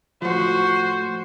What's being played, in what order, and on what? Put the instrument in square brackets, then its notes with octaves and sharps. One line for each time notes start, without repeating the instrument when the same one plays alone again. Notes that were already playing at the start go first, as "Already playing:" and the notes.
[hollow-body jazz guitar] A2 F3 [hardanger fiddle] F#4 [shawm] C5